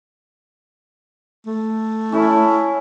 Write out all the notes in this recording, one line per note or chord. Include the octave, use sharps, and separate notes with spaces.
A3
C#4 E4 A4